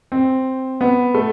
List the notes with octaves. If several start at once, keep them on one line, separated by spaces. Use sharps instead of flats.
C4
B3
A3